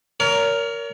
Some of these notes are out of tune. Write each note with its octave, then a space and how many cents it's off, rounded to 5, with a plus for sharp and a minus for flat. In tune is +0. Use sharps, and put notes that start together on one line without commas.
A#4 +0 C#5 +40